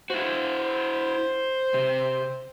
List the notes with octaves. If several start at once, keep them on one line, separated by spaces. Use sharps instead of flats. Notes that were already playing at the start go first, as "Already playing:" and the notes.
E4 F#4 C5
C3